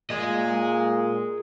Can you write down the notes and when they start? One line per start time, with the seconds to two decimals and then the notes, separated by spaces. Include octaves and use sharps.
0.10 A#2 G#4 D#5